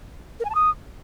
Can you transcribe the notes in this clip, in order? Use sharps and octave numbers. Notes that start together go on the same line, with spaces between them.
A#4
G#5
A5
D#6